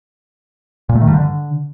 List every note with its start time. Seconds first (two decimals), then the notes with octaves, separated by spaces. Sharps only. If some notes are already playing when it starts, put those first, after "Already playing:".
0.89 A#2
0.95 A3
1.01 D#3
1.07 G2
1.14 D3